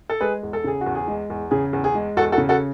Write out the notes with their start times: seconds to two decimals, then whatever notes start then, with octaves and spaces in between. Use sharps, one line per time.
0.10 A4
0.21 G#3 G#4 B4
0.43 E2
0.53 A4
0.64 C#3 G#4
0.81 F#4
0.86 E2
0.95 G#4
1.08 G#3
1.30 E2
1.51 C#3 G#4
1.73 E2
1.84 G#4
1.95 G#3
2.17 E2 F#4 A4
2.32 F#4 A4
2.38 C#3
2.49 F#4 A4